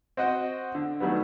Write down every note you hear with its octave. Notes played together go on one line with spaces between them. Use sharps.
C4 F#4 D#5 F#5
D3
D#3 F#3 G3 A3 B3